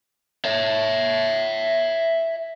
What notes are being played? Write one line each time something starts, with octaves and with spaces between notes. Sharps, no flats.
C#5 E5